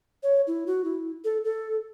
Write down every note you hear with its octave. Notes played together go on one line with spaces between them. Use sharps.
C#5
E4
F#4
E4
A4
A4